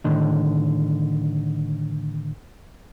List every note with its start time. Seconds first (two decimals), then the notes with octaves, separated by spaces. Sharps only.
0.04 A2 D3 D#3